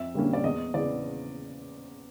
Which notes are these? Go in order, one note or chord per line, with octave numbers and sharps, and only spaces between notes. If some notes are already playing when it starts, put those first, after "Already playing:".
Already playing: F2 E5
D3 G3 A#3 C#4
D5
E2 D#5
C#3 E3 D5